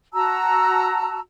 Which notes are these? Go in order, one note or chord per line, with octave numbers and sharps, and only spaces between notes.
F#4 A5 A#5 E6